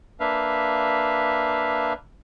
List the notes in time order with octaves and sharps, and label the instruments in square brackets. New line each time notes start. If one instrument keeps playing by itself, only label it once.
[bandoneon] A#3 D4 B4 E5 F5